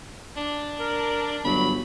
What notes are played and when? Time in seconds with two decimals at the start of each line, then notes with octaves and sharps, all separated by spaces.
0.36 D4
0.79 A#4
1.44 G1 F#3 B5